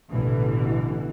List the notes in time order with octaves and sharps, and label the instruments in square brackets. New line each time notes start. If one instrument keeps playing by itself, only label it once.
[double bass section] A1 B2 D3 E3